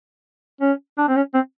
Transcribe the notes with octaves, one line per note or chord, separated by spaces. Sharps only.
C#4
D4
C4
C#4
C4